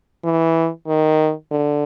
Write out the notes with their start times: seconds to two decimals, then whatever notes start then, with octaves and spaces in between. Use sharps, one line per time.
0.24 E3
0.87 D#3
1.51 D3